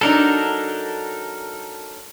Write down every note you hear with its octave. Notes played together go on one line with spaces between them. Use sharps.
F#3 D4 D#4 A4 A#4